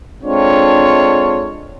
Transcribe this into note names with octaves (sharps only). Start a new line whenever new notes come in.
G#3 C4 D4 F4 A4 C#5